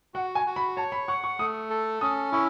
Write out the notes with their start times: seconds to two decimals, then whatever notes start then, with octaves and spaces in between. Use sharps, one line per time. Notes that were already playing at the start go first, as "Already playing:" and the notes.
0.14 F#4 F#5
0.35 G#5
0.46 F#4
0.56 B5
0.77 C#5 A5
0.92 B5
1.08 F#5 C#6
1.24 C#6
1.39 A3 D#6
1.70 A4
2.01 C#4 D#6
2.32 E4 C#6